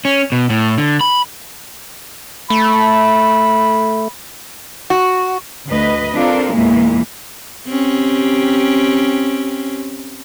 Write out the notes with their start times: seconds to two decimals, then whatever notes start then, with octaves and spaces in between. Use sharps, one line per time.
0.05 C#4
0.32 B2
0.50 A2
0.78 D3
1.01 B5
2.50 A3 B5
4.90 F#4
5.67 D2 B4 D#5
6.16 C4 D4 F4 A4 A#4
6.53 E2 A#2 E3 G#3 A#3
7.68 C4 C#4 G4